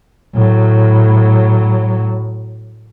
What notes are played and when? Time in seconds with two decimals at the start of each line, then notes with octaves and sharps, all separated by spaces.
0.34 A2 F#3